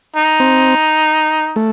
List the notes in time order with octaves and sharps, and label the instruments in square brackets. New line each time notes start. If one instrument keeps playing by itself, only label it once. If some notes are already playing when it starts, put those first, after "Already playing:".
[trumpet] D#4
[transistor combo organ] C4
A3